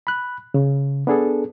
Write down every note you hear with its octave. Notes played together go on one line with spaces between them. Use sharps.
B5 F#6
C#3
B3 D4 G#4 A4